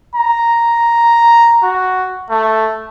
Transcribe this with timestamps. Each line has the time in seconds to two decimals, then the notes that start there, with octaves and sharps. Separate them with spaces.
0.15 A#5
1.63 F#4
2.30 A3